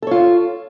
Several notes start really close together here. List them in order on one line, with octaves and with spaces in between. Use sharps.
A4 C#5 F4